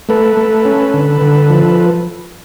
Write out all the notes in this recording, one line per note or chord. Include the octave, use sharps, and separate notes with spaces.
A3 A4 B4
A3
C#4
D3
D3
F3